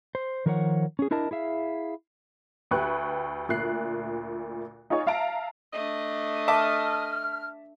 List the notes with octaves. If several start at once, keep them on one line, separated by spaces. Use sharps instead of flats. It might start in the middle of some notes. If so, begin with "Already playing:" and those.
C5
D#3 F3 A#4 C5 C#5 F#5
C#4 G#4
D4 E4 A#4 D#5 A5
E4 G#4 E5 F5
D2 G4 B4 C#6 F#6
D2 A#2 A3 F#6 C7
D#4 F4 G#4 C#5 D#5
E5 F5 A5 A#5 D7
A3 D4 D#5
E5 A5 D6 F6